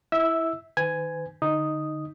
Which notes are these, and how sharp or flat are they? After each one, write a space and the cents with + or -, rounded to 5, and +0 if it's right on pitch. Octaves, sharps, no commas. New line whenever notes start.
E4 +0 E5 -25 E6 +0
D#3 +0 B4 +40 G#5 +0
D3 +15 D#4 +0 D#6 +0